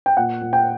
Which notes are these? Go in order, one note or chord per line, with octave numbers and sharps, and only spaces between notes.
G5
A#2 F#5
A#2
G5